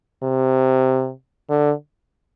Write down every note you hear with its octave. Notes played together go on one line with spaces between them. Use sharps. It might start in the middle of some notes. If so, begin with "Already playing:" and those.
C3
D3